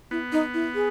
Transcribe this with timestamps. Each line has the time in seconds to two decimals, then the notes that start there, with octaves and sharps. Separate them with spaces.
0.11 B3 E4
0.32 D#4
0.54 E4
0.75 G#4